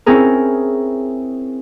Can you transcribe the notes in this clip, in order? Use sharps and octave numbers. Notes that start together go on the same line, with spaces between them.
C4 C#4 E4 G#4 A#4